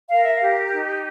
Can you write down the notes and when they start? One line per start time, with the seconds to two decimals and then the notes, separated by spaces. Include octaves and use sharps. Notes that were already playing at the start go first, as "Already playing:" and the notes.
0.11 A#4 F5
0.23 E5
0.35 F5
0.42 G4
0.72 D#4